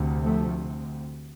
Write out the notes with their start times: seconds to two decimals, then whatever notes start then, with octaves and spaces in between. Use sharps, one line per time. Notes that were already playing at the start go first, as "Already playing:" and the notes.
Already playing: D2 C3
0.23 F3 A3